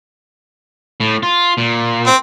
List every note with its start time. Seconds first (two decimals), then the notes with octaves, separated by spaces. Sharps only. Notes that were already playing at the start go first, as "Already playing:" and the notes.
1.00 A2
1.23 F4
1.58 A#2
2.07 C4